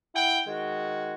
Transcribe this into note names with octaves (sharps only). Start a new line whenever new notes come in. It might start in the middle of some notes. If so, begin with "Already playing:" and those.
E4 F#5 G5
D#3 G#3 F#4